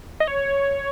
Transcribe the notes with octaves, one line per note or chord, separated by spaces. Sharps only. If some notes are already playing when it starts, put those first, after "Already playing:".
D#5
C#5